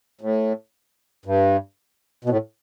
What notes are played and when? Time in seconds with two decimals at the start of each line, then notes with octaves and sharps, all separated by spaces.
0.21 A2
1.26 G2
2.24 B2
2.29 A2